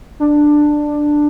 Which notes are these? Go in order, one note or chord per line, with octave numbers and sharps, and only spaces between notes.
D4